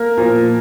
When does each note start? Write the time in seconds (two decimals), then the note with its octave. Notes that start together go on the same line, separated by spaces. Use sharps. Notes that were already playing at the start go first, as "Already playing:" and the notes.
Already playing: A#3 A#4
0.18 A#2 F3